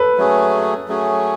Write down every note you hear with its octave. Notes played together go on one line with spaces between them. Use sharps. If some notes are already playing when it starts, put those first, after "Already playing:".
Already playing: A4 B4
F#3 A3 C#4 G#4
F#3 A3 C#4 G#4